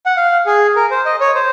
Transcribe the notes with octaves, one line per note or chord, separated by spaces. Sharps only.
F#5
F5
G#4
A#4
C5
D#5
C#5
C5